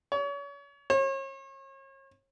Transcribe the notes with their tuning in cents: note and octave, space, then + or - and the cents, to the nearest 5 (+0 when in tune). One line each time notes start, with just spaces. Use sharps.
C#5 +35
C#5 -40